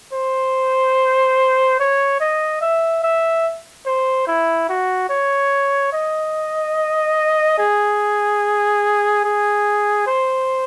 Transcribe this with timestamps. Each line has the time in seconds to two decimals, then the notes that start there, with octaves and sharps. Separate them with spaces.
0.13 C5
1.80 C#5
2.21 D#5
2.61 E5
3.03 E5
3.86 C5
4.27 E4
4.69 F#4
5.09 C#5
5.92 D#5
7.58 G#4
9.24 G#4
10.07 C5